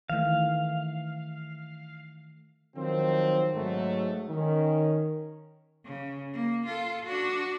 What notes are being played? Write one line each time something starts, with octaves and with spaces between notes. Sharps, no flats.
D#3 E3 A3 F5
D#3 F3 F#3 C4
G#2 F#3 A3
D#3 C#4
C#3
A#3
F4 A4
D4 F#4